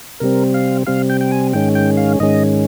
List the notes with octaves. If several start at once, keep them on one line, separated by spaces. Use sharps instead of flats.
C3 G3 C4 A#4
F5
C3 G3 C4 F5
G5
G5
G#5
G#2 D#3 G#3 C#4 G5
G5
F5
G#2 D#3 G#3 C#4 D#5